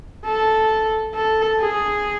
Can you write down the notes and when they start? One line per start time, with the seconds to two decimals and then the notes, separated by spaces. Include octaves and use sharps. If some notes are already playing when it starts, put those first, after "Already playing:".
0.26 A4
1.14 A4
1.60 G#4